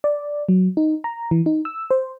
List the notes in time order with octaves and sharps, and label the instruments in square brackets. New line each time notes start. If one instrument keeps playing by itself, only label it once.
[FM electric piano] D5
F#3
D#4
A#5
E3
D#4
E6
C5